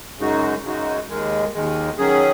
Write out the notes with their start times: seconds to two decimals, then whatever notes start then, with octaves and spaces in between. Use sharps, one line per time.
0.18 F#2 C#3 G#3 D#4 F#4
0.63 F#2 C#3 G#3 D#4 F#4
1.09 D#2 D#3 G#3
1.54 D#2 D#3 G#3
1.98 D#3 F#3 C#4 G#4